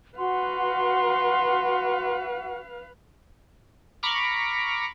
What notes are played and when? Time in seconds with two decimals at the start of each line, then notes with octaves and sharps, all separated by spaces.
0.18 F#4 B4 F5 F#5 C6
4.03 A#5 B5 C#6 D6 F6